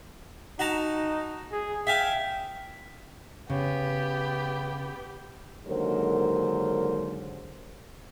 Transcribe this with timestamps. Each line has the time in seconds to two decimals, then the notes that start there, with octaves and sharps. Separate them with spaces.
0.59 D#4 F#4 A5 A#5
1.52 G#4
1.87 E5 F5 G5 G#5
3.50 C#3 B3 G4
5.66 D#2 D3 F#3 G#3 A#4 C5